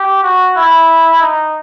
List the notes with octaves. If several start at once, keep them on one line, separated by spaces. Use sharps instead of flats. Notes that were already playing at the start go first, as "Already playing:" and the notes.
Already playing: G4
F#4
E4
D#4